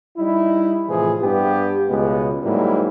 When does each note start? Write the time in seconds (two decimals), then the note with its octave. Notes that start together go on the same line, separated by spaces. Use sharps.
0.18 G3 D#4 E4
0.88 A2 C3 E3 F3 G#4
1.21 G2 B3 G4
1.89 C#2 B2 G#3 B3
2.44 G#2 F#3 G3 A#3 E4